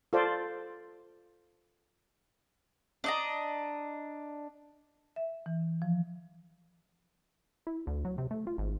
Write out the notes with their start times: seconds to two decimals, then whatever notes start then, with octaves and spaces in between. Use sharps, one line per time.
0.13 F4 A4 C5 D5
3.04 D4 D#5 A#5
5.16 E5
5.46 E3
5.82 F3
7.67 E4
7.87 D2
8.05 F#3
8.18 C3
8.31 A3
8.47 F4
8.58 G#1